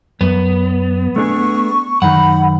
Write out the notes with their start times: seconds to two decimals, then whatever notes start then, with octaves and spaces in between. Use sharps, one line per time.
0.21 F#2 B3
1.16 A3 D4 G#4 C#6
2.02 F#2 D#3 F#5 B5